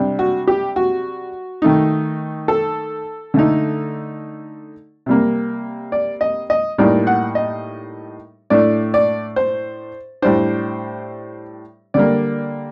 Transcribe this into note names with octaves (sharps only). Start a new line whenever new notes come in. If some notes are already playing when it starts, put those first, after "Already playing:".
Already playing: C3 G3 D4
F#4
G4
F#4
D#3 A3 D#4
A4
D3 A3 D#4
C3 G3 A#3
D5
D#5
D#5
A2 G3 A#3 D#4 D5
F#5
D#5
A2 A3 D4 D5
D5
C5
A2 G3 D4 C5
D3 G3 A#3 D5